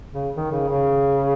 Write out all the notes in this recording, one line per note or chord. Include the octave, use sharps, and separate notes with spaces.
C#3
D#3
C#3
C#3